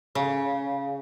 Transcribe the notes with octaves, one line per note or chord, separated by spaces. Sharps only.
C#3